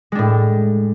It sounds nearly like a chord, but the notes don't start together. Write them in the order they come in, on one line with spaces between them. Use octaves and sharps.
G#3 D4 A2